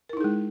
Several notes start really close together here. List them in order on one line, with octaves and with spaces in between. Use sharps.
A#4 E4 D#4 G#4 G#3